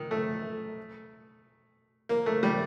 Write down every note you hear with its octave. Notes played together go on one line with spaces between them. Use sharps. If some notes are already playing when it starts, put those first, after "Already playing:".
Already playing: D#3
A3
A#3
A3
G3